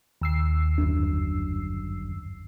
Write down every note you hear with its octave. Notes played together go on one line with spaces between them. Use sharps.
D#2 E6 C7
G1 F#2 D4